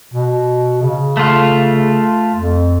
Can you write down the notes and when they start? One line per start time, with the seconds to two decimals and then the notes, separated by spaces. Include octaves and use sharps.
0.14 B2
0.82 C#3
1.17 A3 F4
2.35 F2